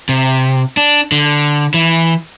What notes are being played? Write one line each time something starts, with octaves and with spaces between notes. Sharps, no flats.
C3
D4
D3
E3